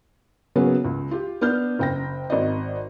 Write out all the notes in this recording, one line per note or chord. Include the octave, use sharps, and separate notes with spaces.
C#3 F#3 A#3 B3 C#4
C#2
F4 G4
B3 D4 F6 G6
F#1 G5 A#6
G#1 D5 D#5